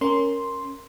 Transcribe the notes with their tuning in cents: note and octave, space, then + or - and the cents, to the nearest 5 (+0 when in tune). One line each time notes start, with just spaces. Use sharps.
C#4 +0 A#4 +0 C6 +0